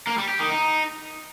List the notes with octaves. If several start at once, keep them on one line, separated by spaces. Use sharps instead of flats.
A#3
G3
G4
D#3
D#4